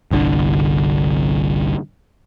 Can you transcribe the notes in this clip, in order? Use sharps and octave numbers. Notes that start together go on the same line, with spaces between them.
G1 C2 D3